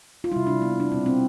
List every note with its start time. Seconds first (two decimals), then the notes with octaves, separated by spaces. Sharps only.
0.24 F4
0.32 C3 G3 E4
0.47 D4
0.62 B3
0.80 D4
0.92 B2 G3 C4
1.06 C4